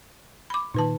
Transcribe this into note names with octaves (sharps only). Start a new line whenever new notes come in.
B5 D6
A#2 D#3 D#4 B4 A5